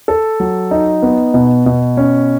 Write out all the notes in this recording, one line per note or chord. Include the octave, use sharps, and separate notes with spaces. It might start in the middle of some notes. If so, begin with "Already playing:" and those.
A4
F#3
D#4
B3
B2
B2
C#4